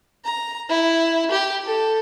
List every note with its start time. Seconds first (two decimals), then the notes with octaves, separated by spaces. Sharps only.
0.25 A#5
0.69 E4
1.31 G4
1.65 A4